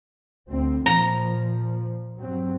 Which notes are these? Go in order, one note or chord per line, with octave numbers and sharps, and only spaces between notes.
D2 C4
A#2 F3 A#5
G2 F#3 C4